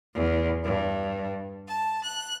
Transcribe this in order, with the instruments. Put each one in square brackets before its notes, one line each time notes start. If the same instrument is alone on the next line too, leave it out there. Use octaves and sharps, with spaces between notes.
[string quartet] E2
G2
A5
F#6